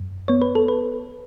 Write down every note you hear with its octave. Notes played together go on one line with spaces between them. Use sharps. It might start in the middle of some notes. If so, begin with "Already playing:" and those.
Already playing: F#2
B3 C#5
B4
A4
B4